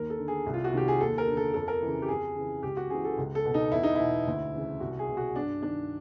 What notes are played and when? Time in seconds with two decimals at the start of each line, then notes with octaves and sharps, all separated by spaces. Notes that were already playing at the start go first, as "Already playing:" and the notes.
Already playing: D#2 A#4
0.10 A4
0.18 D3
0.28 G#4
0.46 C2
0.54 F4
0.64 F#4
0.72 C3 D#3 G4
0.88 G#4
1.01 D#2 A4
1.18 A#4
1.27 D3
1.37 A4
1.54 F2 A4
1.68 A#4
1.82 C#3 E3
2.02 G4
2.08 F2 G#4
2.35 C#3 E3
2.63 C#2 G4
2.77 F#4
2.90 C#3 E3 G#4
3.05 A4
3.18 C#2
3.35 A4
3.45 B2
3.54 D#4
3.71 E2 E4
3.83 D#4
3.95 B2 E4
4.27 D2
4.54 C#3 E3
4.80 C2 F#4
4.99 G#4
5.08 B2
5.17 F#4
5.36 G2 D4
5.62 D#3 D4